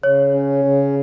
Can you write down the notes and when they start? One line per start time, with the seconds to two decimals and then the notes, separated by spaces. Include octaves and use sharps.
0.03 C#3 C#5
0.34 C#4
0.64 C#3